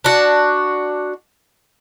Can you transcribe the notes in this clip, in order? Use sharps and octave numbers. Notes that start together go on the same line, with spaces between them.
D4 F#4